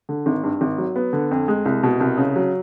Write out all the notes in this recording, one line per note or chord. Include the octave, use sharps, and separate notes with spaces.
D3
G#1
G2
G#1
F#3
B3
D3
F2
G#3
C2
B2
C2
C#3
F#3